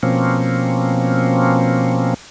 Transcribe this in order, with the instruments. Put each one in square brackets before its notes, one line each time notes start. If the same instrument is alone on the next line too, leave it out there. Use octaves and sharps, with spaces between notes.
[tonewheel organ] B2 F3 A#3 C4 C#4